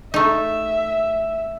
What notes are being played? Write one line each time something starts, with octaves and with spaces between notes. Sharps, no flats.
A3 D#4 E5